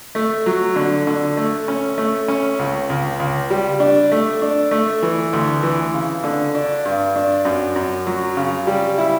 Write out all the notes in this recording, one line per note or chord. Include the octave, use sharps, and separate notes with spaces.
A3
F#3
D3
D3
A3
C#4
A3
C#4
C#2
C#2
C#2
G3
D4
A3
D4
A3
E3
D2
E3
C#3
D3
D4
G2
D4
F#2
F#2
F#3
C#3
G3
E4